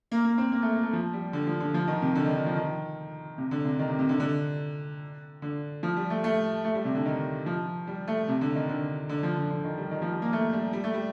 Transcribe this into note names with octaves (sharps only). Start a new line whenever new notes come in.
A#3
A#3
C4
A#3
A3
A#3
A3
F3
G3
D3
F3
D3
F3
D#3
C3
D3
D#3
D#3
F3
D#3
C3
D3
C3
D#3
C3
C3
D3
D3
D3
F3
G3
A3
A3
A3
G3
C3
D3
D#3
F3
G3
A3
C3
D3
D#3
D3
D3
F3
D3
D3
D#3
G3
D#3
F3
G3
A#3
A3
G3
G3
A3
G3